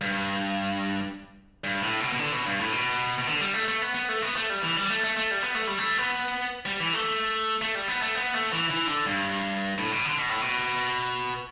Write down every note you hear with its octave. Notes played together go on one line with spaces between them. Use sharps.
G2
G2
A2
B2
B2
D3
B2
G2
A2
B2
B2
D3
G3
A3
A3
B3
B3
A3
B3
A3
G3
E3
G3
A3
A3
A3
G3
B3
A3
G3
A3
B3
G3
E3
A3
A3
G3
B3
A3
B3
A3
E3
E3
D3
G2
A2
B2
D3
B2
A2
B2